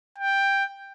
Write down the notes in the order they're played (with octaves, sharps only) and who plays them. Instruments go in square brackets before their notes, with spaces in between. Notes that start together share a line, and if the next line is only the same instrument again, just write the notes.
[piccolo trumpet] G5